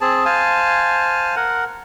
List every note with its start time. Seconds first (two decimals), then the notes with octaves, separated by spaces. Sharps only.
0.01 C4 G#4 A5
0.25 C5 F5 G#5 A5
1.36 A#4 F#5